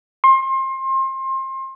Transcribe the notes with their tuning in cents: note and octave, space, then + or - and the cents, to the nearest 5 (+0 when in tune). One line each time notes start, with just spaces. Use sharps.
C6 +30